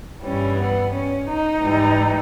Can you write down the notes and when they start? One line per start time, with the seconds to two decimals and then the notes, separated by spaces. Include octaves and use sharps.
0.23 G2 E3 G3 C#4
0.58 B3
0.93 C#4
1.28 D#4
1.63 G#2 E3 G3